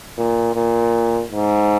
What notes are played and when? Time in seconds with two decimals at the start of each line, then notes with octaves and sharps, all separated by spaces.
0.18 A#2
0.55 A#2
1.31 G#2